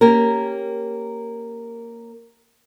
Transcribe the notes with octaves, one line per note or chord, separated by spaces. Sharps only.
A#3 C#4 G4 A#4